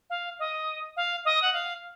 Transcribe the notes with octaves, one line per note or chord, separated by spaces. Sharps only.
F5
D#5
F5
D#5
F#5
F5